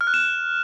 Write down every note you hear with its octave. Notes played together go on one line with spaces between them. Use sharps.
F6
F#6
E7